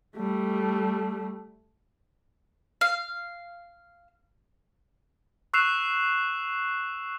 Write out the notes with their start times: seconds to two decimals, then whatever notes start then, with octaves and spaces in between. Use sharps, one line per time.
0.17 G3 A3
2.81 F5
5.53 C#6 E6 F#6 C7 E7 F7